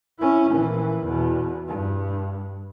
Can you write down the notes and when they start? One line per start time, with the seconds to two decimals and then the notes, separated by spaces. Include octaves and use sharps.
0.19 C#4 E4
0.52 A#1 E3
1.04 E2 B2
1.68 G2